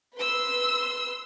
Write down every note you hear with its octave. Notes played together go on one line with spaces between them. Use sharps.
B4 C6 E6